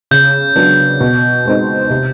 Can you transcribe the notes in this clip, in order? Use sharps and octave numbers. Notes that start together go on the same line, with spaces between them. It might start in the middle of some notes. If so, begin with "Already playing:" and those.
C#3 G6
F#3 B3 D4
B2
G#3 C4 D#4
C3